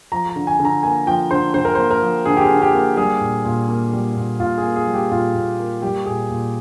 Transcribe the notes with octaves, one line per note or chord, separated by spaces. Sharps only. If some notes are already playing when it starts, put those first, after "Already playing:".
F3 A#5
A#5
D3
G#5
D3
A#5
A#3 G#5
F3 G5
D3 C5
D3 C5
A#4
A#3 C5
A#4
F3
D3 G#4
G4
G#4
D3
G4
A#3
G3 G#4
A#2
A#2
A#3
G3
A#2
A#2 F4
G#4
A#3
G#4
G3
G4
A#2 F4
A#2
A#3
G3 G4
A#2 G#4
A#2